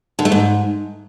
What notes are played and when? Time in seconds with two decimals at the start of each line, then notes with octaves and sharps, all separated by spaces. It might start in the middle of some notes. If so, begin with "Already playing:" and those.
0.19 D3
0.25 A3
0.32 G#2